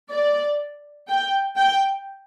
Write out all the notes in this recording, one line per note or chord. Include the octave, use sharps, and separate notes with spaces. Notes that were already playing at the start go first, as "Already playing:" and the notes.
D5
G5
G5